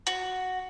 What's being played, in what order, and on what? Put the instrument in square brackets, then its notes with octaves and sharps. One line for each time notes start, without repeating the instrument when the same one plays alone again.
[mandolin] F#4